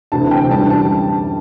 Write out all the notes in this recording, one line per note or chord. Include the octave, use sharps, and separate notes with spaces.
D2 C3 E3 A5
G5
F#2 E3 G3 D4 A5
A5